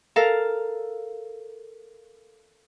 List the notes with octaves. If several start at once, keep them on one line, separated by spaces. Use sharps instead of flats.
A4 A#4 F5